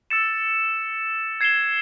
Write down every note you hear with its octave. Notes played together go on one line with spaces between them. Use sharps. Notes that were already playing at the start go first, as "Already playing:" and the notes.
E6 A6 C#7 E7
G#6 C7 E7 G7